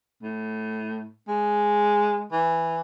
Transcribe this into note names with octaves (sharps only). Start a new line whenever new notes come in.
A2
G#3
E3